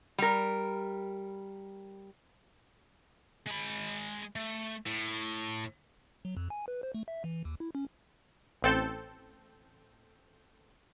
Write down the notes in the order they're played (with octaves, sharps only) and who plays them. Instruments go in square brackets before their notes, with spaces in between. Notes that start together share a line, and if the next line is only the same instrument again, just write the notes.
[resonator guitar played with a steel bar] G3 A#4
[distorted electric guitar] G#3 B5
A3
A2
[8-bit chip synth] F#3
F2
G#5
B4
C5
A3
E5
E3
D#2
E4
C#4
[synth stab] A1 C4 A4 G6